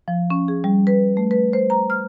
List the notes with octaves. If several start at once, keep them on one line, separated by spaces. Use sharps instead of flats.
F3
C#4
G#4
G3
B4
A3
B4
C5
A#5
F6